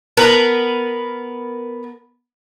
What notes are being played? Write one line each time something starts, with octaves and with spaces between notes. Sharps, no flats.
B3 A#4 B4